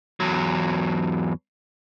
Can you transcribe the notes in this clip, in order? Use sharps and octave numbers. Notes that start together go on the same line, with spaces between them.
E2 F#3